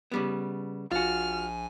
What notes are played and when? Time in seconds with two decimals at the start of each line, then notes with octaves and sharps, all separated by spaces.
0.12 C#3 G3 B3
0.92 A#1 F4 F#4 G#5 F6